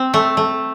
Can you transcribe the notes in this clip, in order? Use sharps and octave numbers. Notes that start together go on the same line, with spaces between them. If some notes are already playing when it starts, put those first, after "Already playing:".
Already playing: C4
A3
A3